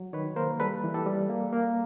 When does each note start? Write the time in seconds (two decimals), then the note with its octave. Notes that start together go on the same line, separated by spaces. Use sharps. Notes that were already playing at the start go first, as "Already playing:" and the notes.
Already playing: F#3
0.13 D#3 B4 C#5
0.36 A#3 A#4 C5
0.60 G3 A4 B4
0.84 E3
0.94 G4 A4
1.06 G3
1.30 A#3
1.52 A#3